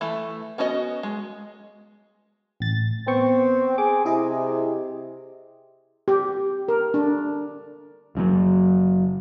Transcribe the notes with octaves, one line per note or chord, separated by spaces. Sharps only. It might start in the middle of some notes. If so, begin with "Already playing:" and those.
E3 A3
B3 C#4 F#4 C#5 D#5
G#3
A1 A6
B3 C4 G5 C#6
G#4 D6
C3 E4 G#4 D#5
G4
A#4
D4
F#1 F#2 C#3 F#3